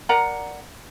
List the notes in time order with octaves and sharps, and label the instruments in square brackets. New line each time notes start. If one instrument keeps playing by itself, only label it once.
[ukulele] A#4 D5 F#5 A#5